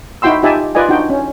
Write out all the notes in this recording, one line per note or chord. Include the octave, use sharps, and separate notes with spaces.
D#4 E4 F#4 G5 C6 E6
D#4 F4 G4 E5 G#5 A5
F4 B4 D5 D#5 G#5
D4 D#4 F#4 G5
C#4